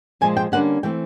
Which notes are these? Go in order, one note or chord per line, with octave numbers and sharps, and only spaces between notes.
A#2 F3 G#3 G#5
G5
D3 G3 A#3 C#4 F#5
E3 A3 C4 G5